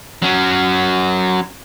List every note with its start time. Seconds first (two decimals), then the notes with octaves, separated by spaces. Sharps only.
0.22 F#3 C#4